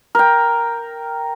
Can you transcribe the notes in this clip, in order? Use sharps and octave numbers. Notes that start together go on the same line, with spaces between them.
A#4 G5